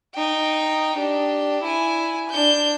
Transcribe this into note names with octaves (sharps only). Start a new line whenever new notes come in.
D#4 G5
D4 G4
E4 G#5
D4 G6